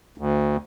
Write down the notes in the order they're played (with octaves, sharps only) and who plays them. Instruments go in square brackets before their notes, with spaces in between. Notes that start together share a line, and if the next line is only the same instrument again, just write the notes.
[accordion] D2